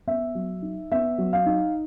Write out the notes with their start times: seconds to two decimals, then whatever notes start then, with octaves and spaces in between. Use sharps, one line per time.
0.07 B3 E5
0.35 F#3
0.62 D#4
0.92 B3 E5
1.18 F#3
1.33 F5
1.46 D#4